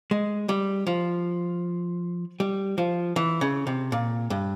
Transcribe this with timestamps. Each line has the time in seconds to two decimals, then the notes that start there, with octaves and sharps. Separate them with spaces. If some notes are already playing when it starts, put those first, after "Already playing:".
0.11 G#3
0.49 G3
0.87 F3
2.40 G3
2.78 F3
3.16 E3
3.41 C#3
3.67 C3
3.92 A#2
4.30 G2